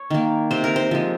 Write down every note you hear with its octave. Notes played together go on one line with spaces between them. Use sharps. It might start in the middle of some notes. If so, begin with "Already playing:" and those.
Already playing: C#5
D#3 A#3
C3 C5
A#4
C5
F3 G#3